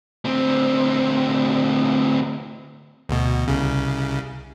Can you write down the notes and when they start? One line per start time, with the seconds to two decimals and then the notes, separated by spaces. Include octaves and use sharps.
0.25 D2 C4
3.09 D2 B2
3.48 C2 C#3